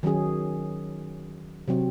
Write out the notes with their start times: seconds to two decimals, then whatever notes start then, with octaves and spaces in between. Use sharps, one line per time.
0.03 D#3 F#3 C#4 G#4
1.68 C3 F#3 C4